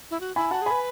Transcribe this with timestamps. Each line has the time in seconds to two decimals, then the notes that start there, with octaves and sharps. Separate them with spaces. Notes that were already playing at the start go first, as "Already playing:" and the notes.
0.11 E4
0.20 F#4
0.36 E4 G#5 B5
0.51 F#4 F#5 A5
0.62 G#4
0.66 G#5 B5
0.72 B4